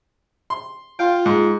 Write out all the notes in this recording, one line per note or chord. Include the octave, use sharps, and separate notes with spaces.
C6
F4 F5 G5
G#2